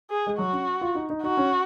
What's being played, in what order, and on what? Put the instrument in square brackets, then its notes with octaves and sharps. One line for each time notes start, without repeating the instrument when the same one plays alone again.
[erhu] G#4
[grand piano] G#3
[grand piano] F#3 [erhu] F#4
[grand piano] C#4
F4
D#4
D#4
[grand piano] D#4 [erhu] F#4
[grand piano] C#4